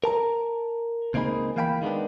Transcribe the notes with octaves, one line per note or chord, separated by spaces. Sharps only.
A#4 A5 A#5
C#2 A#3 C4 D#4 G#4 B5
E3 A#3 F5 G5 G#5 B5
D#3 G#3 A#3 B3 D4